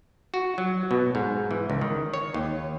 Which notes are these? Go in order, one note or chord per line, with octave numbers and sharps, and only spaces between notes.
F#4
F#3
B2
G#2
E3
C#2
D#3
C#5
D#2